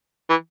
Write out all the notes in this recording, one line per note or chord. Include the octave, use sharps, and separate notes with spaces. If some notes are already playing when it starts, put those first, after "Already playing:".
E3